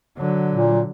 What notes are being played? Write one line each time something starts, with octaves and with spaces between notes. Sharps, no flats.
D3 F#3
A#2